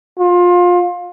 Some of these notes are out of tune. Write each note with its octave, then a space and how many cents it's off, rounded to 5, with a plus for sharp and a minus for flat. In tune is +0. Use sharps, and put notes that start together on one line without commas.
F4 +25